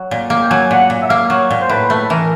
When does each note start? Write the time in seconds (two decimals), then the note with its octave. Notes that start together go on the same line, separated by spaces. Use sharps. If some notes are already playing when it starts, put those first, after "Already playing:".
Already playing: F#3
0.11 A#2
0.30 A#3
0.42 G5
0.50 F#3 G#5
0.71 A#2 F#5
0.90 A#2
1.03 E5
1.10 A#3 F5
1.30 F#3 C#5
1.51 A#2
1.61 C5
1.69 A2 B4
1.89 A3 B4
2.10 E3 A#4